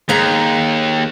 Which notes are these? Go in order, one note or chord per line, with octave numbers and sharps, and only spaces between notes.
D#2 A#3 G#4 A#5